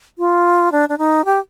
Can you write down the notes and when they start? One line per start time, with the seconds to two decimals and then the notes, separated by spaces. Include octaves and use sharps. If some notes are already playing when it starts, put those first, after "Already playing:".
0.18 F4
0.72 D4
0.89 D4
0.98 D#4
1.25 G4